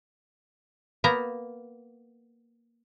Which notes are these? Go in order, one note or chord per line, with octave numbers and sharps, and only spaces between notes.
A#3 B3 A#5